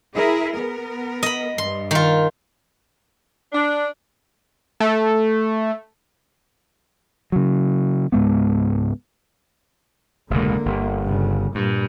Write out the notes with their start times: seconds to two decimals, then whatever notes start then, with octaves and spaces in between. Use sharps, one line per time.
0.14 E4 G#4 A#4
0.52 B3 A#4
1.23 D#5 B5
1.58 G2 C6
1.91 D#3 F4
3.52 D4
4.80 A3
7.32 C#3 F#3
8.12 C#2 G#2 G#3 B3
10.30 E1 C#2 B2 D3 A#3
10.65 G1
11.03 G2 C#3
11.55 G2 A#2 G3